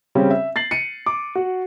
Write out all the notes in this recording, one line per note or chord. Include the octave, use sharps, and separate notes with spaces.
C#3 G3 C4 C#4
E5
A6 C7 F#7
C#7 D#7
D6
F#4